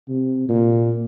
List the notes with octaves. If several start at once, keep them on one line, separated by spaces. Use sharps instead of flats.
C3
A#2